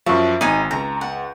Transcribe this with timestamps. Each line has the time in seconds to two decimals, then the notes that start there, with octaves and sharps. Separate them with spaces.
0.06 F#2 F3 E5 C#6
0.41 G#1 D#4 G#5
0.71 C#2 A#5
1.01 F#5